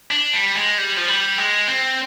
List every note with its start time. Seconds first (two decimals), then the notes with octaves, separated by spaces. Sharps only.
0.11 D4
0.33 G3
0.55 G#3
0.78 G3
0.97 F3
1.08 G3
1.38 G#3
1.67 C4